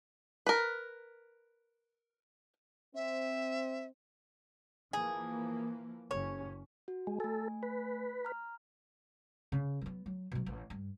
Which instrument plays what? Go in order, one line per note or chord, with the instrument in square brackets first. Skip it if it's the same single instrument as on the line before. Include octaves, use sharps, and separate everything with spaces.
[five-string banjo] A#4 B4
[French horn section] C4 [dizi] E5
[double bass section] E3 F3 A#3 [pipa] G#4
[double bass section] F#1 C#4 [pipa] C#5
[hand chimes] F#4
[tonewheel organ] G#3
[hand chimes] A3 G#5 [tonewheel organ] A4
[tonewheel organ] B4
[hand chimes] A#5 F6
[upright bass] C#3
F#3 B3
F#3
B2 F#3
A1
G2